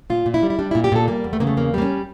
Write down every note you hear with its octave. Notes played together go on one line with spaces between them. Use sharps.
A#2 F4
A#2
E4
G3
E4
G3 D4
E4
A#2
G4
A#2 A4
G3 A#3
E2
A3
C#3 A#3
A3
E2 A#3
G3 A#3
C#4